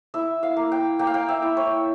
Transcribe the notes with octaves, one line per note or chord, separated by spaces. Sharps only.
E4 E5
F5
A#3
G5
A#3 G5
F5
G5
E5
E4
C#5